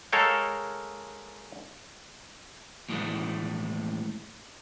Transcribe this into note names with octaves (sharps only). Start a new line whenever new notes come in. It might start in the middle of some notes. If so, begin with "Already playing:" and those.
G#3 A4 A#4 C#5 F5 G5
D#2 A2 E3 F#3 G#3 A3